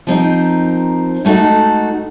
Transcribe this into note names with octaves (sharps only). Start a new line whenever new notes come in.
F3 C4 D#4 A#4
G#3 A3 D#4 F#4 A4